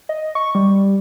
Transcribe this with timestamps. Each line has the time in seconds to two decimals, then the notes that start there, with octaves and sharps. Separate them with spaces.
0.09 D#5
0.35 C#6
0.55 G3